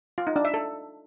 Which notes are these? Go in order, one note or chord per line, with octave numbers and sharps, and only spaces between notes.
F4
D#4
D4
E5
A4